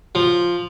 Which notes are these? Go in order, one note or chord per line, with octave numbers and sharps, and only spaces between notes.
F3